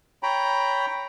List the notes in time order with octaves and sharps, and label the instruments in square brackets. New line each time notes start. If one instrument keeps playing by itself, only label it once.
[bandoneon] C#5 G5 A#5 B5